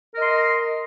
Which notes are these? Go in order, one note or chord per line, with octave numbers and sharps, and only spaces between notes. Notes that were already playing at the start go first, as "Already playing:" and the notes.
A#4 D#5 C6